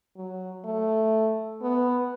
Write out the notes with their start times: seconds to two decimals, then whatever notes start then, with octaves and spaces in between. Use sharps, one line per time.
0.16 F#3
0.65 A3
1.62 B3